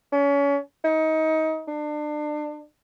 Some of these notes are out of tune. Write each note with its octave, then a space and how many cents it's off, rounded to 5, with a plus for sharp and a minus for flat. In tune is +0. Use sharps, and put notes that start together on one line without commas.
C#4 +30
D#4 +25
D4 +30